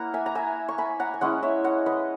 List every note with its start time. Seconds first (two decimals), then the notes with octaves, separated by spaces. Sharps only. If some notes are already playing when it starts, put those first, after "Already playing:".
Already playing: A#3 E4 F#5 A#5
0.14 E5 G#5
0.26 A#5
0.35 E5 G#5
0.69 C#6
0.78 G#5 B5
1.00 F#5 A#5
1.14 G#5
1.21 G#3 C#4 E4 D#5 F#5
1.43 C#5 E5
1.64 D#5 F#5
1.86 B4 D#5